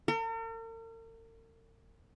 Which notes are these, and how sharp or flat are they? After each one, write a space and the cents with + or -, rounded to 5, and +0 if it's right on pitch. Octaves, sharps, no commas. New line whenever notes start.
A#4 -45